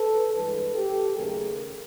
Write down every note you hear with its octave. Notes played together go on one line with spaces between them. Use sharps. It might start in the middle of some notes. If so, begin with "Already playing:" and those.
Already playing: A4 B4
G2 E3 G#3 A4 B4
G4 A4
D#2 C#3 F#3 A3 G#4 A#4